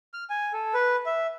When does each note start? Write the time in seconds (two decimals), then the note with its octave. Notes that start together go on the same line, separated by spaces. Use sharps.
0.14 F6
0.30 G#5
0.53 A4
0.74 B4
1.06 E5